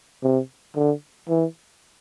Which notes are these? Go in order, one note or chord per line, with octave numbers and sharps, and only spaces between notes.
C3
D3
E3